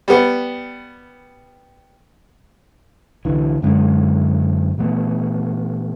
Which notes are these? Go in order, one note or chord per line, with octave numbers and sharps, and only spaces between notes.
G3 B3
C2 D3 E3
F#2 D3 G#3 C#4
A#2 E3 A3 B3